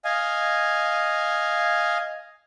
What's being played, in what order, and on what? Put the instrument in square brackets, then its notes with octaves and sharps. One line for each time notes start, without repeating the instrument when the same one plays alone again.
[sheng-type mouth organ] D#5 F5 G#5